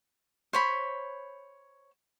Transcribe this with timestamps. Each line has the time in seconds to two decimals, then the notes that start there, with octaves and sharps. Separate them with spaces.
0.53 C5 C#5 B5